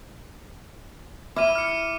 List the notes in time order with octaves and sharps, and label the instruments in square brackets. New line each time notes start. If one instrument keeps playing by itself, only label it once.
[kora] E4 [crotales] D6 F6 D#7
[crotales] F6 C#7